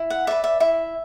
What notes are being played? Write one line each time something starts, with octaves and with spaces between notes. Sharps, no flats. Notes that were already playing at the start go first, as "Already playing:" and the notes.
Already playing: E4
F#5
B4 D5 E5
E5
E4 E5